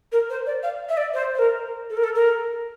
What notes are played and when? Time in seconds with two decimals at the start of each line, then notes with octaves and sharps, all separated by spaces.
0.12 A#4
0.30 C5
0.47 D5
0.63 F5
0.89 E5
0.97 D5
1.14 C5
1.35 C5
1.39 A#4
1.90 A4
1.97 A#4
2.04 A4
2.15 A#4